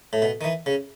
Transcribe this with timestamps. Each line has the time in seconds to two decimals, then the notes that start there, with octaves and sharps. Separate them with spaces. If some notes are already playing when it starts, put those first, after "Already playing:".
0.13 A2
0.22 B2
0.41 D#3
0.44 E3
0.66 C#3